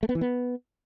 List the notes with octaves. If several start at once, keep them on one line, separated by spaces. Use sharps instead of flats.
A3
B3
E3
B3